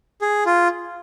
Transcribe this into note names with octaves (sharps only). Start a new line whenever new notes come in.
G#4
F4